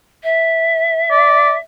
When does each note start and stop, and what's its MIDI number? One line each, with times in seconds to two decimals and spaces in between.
0.23 1.58 76
1.11 1.54 74